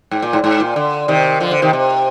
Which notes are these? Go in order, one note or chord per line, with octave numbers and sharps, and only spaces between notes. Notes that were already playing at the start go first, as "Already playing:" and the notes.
G#2
A#2
G#2
G#2
A#2
D3
C3 D#3
D3 F3
D3
C3 D#3
C3